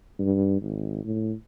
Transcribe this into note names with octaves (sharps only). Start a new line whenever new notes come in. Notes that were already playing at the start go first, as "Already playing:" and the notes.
G2
G#1
A2